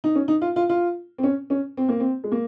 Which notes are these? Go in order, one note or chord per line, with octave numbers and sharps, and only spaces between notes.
D#4
C#4
D#4
F4
F4
F4
C4
C#4
C#4
C4
A#3
C4
G#3
A#3